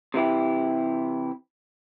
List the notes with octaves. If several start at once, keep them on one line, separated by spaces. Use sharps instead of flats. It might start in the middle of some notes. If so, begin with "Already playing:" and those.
C3 E3 E4 G4